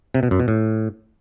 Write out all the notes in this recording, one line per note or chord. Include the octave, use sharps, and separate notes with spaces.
C3
B2
F#2
B2
A2